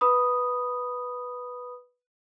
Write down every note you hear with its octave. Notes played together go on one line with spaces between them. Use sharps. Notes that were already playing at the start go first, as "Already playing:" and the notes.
B4 B5 D#6